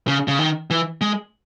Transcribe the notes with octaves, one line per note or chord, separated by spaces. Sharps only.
C#3
C#3
D#3
E3
G#3